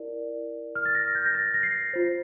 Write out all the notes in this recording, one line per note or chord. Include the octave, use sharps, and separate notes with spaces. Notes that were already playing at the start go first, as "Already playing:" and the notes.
Already playing: E4 A#4 D5
F6
A6
A#6
G6
A#6
A6
A#6
C7
F4 C5